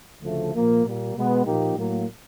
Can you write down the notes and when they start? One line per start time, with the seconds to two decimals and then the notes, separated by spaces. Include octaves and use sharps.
0.23 D2 C#3 F3 A3
0.54 A#2 F3 A#3
0.83 A#2 G3 A#3
1.15 B2 G#3 B3
1.44 A#2 F3 A#3 D#4 G4
1.75 A2 F#3 A#3